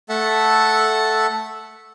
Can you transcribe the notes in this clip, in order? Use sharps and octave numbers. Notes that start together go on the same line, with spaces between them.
A3 A4 E5 F#5 A5